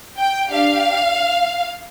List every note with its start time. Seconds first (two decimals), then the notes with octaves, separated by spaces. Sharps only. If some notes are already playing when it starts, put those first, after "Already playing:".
0.18 G5
0.50 D4 G4 F5